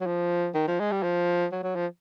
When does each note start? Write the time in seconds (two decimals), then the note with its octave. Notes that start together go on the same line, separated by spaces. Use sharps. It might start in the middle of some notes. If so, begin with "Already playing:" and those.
0.01 F#3
0.06 F3
0.55 D#3
0.67 F3
0.80 G#3
0.92 G3
1.03 F3
1.52 F#3
1.63 F#3
1.75 F3